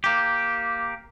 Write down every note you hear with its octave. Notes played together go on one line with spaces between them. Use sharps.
A#3 G4